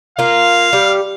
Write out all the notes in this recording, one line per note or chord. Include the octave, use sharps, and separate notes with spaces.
A#3 F4 F5
G3